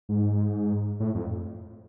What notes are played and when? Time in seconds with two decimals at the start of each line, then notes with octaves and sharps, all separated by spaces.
0.09 G#2
1.00 A2
1.15 F2